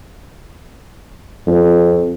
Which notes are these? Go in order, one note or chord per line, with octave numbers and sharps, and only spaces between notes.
F2